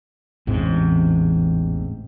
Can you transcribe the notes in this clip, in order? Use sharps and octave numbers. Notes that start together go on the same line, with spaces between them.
A1 E2 G#2 C3